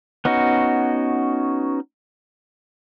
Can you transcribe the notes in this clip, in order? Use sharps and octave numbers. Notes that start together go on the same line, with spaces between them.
B3 C#4 D#4 F#4